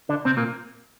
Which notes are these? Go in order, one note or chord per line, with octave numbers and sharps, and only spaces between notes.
D3 D4
C3 C4
A#2 A#3